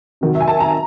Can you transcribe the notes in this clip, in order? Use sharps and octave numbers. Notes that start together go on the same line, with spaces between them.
C3 D#3 F#3
E5
G#5
A5
A#5